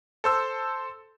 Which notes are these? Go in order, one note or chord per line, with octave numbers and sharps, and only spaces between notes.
A4 C5 E6